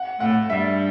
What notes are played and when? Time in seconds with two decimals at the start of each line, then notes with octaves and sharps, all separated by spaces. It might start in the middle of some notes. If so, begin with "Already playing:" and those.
Already playing: F#5
0.19 A2 A3 F#5
0.50 G2 G3 E5